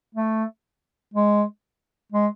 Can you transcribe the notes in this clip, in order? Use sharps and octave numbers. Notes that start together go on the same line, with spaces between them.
A3
G#3
G#3